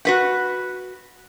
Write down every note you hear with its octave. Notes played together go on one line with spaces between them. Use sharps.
F#4 B4 F#5